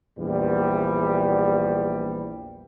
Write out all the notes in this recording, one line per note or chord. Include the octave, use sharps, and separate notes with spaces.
A#1 E2 G3